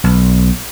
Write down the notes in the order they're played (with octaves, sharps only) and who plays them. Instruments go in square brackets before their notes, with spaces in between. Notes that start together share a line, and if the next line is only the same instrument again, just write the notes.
[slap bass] B1